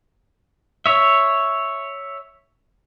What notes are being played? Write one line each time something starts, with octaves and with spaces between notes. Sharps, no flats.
C#5 E5